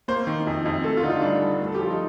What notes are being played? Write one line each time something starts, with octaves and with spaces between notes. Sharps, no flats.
A#3 C5
D#3
F2
F2
A3 A4
F4
D3 D#4
F4
G2 D4
G2
A3
A4
G4
F3 F4
D#4